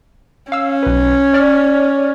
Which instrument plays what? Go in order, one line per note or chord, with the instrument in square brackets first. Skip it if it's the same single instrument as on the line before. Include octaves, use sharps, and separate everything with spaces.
[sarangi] C#4 [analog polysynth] F5 E6
[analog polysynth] B1 B4
C#5 D5 F6